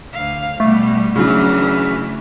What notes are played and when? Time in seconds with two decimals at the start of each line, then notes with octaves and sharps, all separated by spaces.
0.13 D2 F5
0.60 B2 G3 A3
1.16 C#3 E3 F#3 D4